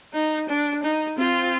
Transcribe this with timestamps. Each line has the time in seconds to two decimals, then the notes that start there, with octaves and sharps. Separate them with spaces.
0.14 D#4
0.49 D4
0.83 D#4
1.18 C4 F4